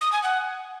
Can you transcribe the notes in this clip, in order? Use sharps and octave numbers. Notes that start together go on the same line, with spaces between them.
D#6
G#5
F#5